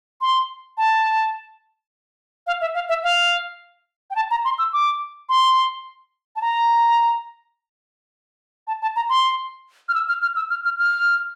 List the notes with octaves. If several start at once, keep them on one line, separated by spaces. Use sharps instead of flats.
C6
A5
F5
E5
F5
E5
F5
G5
A5
A#5
C6
E6
D6
C6
A5
A#5
A5
A5
A#5
C6
F6
E6
F6
F6
E6
F6
F6
F6